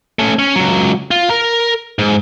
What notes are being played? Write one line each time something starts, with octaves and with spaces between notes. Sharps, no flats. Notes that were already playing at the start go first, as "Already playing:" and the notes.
A3 C#4
C#4
C#2 F#3
F4
A#4 A#5
G#2